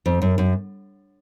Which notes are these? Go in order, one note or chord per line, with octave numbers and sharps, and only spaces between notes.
F2
F#2
F#2